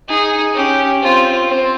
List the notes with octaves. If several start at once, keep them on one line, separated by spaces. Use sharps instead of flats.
D#4 G#4
C#4 G4
C4 F4
C4